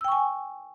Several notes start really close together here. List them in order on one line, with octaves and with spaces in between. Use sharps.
E6 G5 C#6 G#5